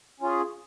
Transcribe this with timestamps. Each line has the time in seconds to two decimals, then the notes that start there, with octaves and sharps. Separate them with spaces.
0.20 C#4
0.23 F4
0.26 G#4